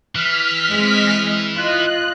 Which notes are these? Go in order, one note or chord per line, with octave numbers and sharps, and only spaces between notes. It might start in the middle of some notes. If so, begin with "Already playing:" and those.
E3 F6 B6
G#3 C4 D#5
F4 D#5 F#6